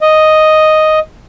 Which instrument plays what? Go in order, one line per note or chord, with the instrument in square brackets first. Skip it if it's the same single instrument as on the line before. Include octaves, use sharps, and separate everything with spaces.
[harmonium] D#5